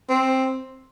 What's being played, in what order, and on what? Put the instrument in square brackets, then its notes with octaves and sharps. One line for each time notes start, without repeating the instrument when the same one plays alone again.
[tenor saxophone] C4